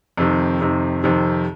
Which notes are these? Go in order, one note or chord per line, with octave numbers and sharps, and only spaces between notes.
F2 C3 D#3
F2 C3 D#3
F2 C3 D#3